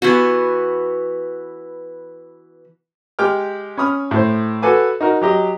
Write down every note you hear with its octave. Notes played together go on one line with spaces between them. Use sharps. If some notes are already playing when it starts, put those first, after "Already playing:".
E3 B3 F#4
G#3 G4 G5 D6 F6
C#4 B5 D#6 F6
A2 C5
F#4 A4 B4 G#5 D6
D#4 F#4 A#4
F#3 G4 D#5